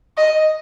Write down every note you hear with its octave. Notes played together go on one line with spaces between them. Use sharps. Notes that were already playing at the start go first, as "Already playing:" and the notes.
D#5